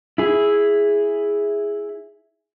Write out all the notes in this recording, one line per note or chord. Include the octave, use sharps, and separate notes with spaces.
E4 G#4